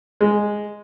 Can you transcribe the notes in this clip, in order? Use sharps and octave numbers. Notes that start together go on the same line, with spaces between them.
G#3